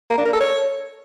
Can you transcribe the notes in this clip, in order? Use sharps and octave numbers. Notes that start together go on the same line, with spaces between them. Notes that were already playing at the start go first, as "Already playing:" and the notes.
A#3
D4
A#4
A4
C#5